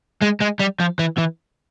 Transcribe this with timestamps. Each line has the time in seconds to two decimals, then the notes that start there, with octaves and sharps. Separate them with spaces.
0.22 G#3
0.41 G#3
0.60 G3
0.80 F3
0.99 E3
1.17 E3